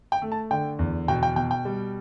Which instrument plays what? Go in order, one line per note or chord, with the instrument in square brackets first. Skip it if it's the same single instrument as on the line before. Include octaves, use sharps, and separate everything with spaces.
[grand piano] G5
A3
A5
D3 G5
E2
B2 G5
G5
B2 G5
G5
G3